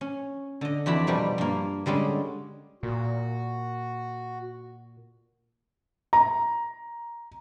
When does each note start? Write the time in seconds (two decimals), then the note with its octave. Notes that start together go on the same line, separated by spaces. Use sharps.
0.01 C#4
0.61 D3 D#5
0.86 F2 E3 F#4 D5 A5 B5
1.07 B2 F3 G3 A#3
1.38 G2 A#3
1.86 D3 G3 G#3 C#4
2.83 A#2 F#4
6.13 A#5